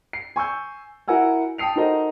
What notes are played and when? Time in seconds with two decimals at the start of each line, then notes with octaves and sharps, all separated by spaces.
0.13 C7
0.36 G#5 C#6 E6 G6
1.08 E4 F#4 A#4 F#5 G#5 E6
1.58 G5 A5 D#6 C7 F7
1.76 D#4 F#4 A4 A#4 C5 D#5